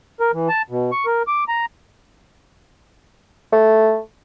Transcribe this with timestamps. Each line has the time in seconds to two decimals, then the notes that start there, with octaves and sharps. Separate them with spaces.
0.20 A#4
0.33 E3
0.49 A5
0.70 B2
0.92 C#6
1.06 A#4
1.27 D6
1.48 A#5
3.52 A3